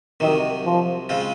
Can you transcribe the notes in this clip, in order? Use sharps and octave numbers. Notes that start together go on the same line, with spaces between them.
C2 C3 D#3 F#3
F3
C#3 G#3 C4 F4